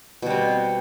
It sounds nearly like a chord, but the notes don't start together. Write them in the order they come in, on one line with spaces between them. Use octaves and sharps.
B2 G3 C4